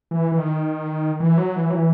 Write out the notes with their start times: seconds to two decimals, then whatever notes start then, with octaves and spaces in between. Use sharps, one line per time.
0.11 E3
0.32 E3
0.38 D#3
1.20 E3
1.38 F#3
1.56 E3
1.70 F#3
1.74 E3